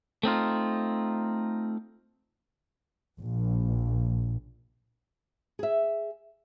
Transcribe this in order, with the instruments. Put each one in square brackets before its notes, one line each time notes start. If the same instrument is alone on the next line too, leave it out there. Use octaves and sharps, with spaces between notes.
[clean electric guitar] A3 C4 D#4 F4
[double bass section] A#1
[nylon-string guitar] G#4 E5